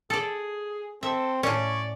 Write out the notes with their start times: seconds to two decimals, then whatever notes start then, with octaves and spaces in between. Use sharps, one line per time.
0.10 G#4 A4 D5
1.03 C4 A4 E5
1.43 A2 C#4 C#5 D5